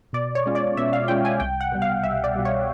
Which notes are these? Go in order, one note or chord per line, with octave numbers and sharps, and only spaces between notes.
B2 D5
C#5
G#3 C#4 F4
D5
B2 E5
F5
G#3 C#4 F4 G5
G#5
C2 G5
F#5
B2 G3
F5
C2 E5
D5
B2 G3
C#5